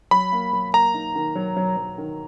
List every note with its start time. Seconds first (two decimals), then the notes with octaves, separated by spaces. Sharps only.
0.11 F#3 B5
0.32 A#3
0.53 F#3
0.74 A#3 A#5
0.94 D#4
1.15 D#3
1.35 F#3
1.56 F#3
1.77 F#3
1.98 D#3